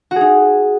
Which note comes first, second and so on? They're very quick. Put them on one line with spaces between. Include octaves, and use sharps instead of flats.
F#4 G#4 D#4